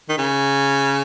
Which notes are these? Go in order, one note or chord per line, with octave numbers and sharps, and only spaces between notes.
D#3
C#3